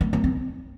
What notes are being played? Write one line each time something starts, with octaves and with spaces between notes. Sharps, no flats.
A3
A3
C4